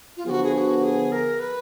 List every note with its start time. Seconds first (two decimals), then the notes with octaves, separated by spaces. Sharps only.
0.17 F4
0.26 D3 F3 B3 F#4 G#4
0.44 G#4
0.54 G#4
0.58 F#4
0.83 G#4
1.12 A#4
1.40 B4